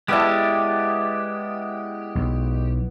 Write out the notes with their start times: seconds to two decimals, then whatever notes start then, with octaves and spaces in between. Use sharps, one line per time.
0.08 G#3 B3 E4 G4 D5 A5 D6
2.15 B1